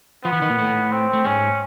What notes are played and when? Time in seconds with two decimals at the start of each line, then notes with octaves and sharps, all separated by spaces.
0.25 F3 B3 F4
0.32 E3 E4
0.41 D#3 D#4
0.50 A#2 A#3
0.58 A2 A3
0.92 C4
1.13 A3
1.25 G#2 G#3 C#4